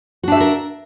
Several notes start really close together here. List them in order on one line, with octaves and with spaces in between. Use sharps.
F#4 D4 E5 G4 A#4